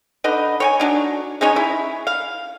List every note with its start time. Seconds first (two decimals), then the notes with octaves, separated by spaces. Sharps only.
0.24 D3 D#4 B4 D#5
0.60 C#5 G5 G#5
0.80 F#3 D4 D#4
1.41 G#3 C#4 D#4 C#5
1.56 E4
2.07 F5